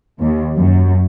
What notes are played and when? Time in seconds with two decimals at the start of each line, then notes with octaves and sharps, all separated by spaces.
0.20 D#2
0.56 F#2